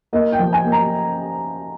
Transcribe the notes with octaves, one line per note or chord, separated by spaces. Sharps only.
A#3 D#5
G5
F3
G#5
A#3
A#5